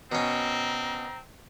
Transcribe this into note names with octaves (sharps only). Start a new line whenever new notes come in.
B2 C4 C#4 A#5